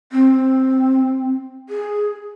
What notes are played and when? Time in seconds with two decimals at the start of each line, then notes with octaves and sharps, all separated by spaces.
0.12 C4
1.69 G#4